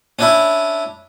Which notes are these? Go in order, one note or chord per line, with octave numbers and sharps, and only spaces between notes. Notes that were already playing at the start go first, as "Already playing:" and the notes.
C#4 D4 E4